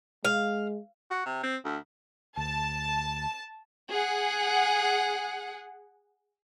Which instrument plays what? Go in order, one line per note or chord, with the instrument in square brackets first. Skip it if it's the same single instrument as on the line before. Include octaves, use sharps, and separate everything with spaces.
[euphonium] G#3 [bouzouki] F5
[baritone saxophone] F#4
C3
C4
D2
[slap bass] D2 [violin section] A5
[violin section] G#4 F#5